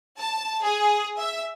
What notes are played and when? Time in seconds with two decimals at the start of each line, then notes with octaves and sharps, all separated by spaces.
0.18 A5
0.62 G#4
1.18 E5